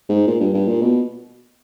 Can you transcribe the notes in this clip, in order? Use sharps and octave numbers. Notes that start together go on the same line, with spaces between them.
G#2
A#2
G2
G2
A#2
B2